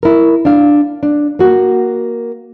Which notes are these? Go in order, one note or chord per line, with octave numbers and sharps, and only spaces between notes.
E4 A#4
D4 F5
D4
A#3 F#4